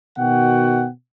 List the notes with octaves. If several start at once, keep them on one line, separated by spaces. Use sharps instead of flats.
B2 D#3 F#4 F#5 G5